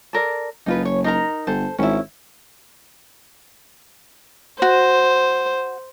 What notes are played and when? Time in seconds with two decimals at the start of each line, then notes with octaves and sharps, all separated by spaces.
0.13 A4 A#4 D5
0.66 F#1 D#4 F4 B4
0.85 C#5
1.04 D#4 A#4 A#5
1.47 G1 A4 C5
1.78 G#1 C#4 E4
4.62 F#4 C5